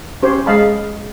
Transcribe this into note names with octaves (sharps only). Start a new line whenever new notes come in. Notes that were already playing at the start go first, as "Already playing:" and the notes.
C#4 G4 C5 C#5
G#3 D#5 F5 A5 B5